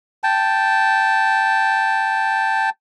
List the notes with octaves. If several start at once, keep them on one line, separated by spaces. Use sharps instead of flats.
G5 A5